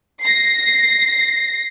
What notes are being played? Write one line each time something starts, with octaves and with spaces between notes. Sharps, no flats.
A#6 C7